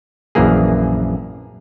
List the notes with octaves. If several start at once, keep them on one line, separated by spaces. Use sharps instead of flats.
A#1 F#2 E3 A#3 G#4